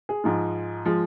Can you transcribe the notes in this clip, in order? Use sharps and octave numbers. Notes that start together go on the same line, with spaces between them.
G#4
G#2 F3 G#3
F3 G#3